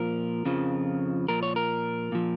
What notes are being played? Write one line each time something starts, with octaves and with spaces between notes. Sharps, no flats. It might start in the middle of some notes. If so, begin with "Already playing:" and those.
Already playing: A#2 F3 A#4
F2 C#3 F3
A#2 F3 A#4
C#5
A#4
A#2 F3